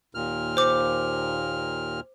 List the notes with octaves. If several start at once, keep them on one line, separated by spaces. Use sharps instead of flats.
D#2 A#2 F6
C5 D6